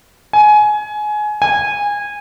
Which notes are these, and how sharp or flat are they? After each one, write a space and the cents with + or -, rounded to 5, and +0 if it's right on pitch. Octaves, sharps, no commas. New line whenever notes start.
G#5 +20
G#5 -20